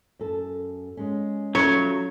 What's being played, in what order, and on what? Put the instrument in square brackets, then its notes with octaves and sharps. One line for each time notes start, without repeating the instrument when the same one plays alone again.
[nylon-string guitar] F#2 A4
G#3 C#4
[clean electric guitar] F#3 [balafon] C#4 A4 [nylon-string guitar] E4 F4 [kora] C#5